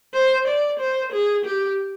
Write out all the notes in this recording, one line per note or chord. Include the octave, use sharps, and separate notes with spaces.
C5
D5
C5
G#4
G4